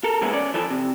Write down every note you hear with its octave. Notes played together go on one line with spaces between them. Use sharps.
A4 A#4
E3 G#3 A#3 B3 C#4 E4
C#4 D5
E3 F3 A4
C3